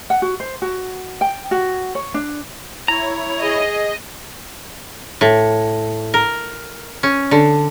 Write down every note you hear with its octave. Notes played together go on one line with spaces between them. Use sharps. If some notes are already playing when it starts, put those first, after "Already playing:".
F#5
F#4
C5
F#4
G5
F#4
C#5
D4
E4 C#5 A#5
G#4 D#5
A2
A#4
C#4
D3